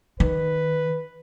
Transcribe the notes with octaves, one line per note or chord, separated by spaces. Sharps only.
D#3 B4